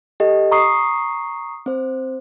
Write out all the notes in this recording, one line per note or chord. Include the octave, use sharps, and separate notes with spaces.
G4 A4 D#5
A#5 C#6 D#6 C7
C4 C5